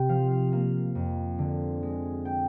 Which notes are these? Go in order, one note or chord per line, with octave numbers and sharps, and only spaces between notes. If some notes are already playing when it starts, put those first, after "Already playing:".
Already playing: C3 G5
F3 F5
F5
A#3 F5
F2
D3
G#3
G5